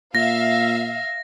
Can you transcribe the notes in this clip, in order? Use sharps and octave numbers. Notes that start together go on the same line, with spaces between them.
A#2 E5 F5 A#6